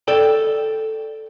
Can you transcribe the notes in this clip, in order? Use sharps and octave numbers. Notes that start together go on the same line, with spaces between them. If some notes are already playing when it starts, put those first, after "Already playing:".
A4 D5 G5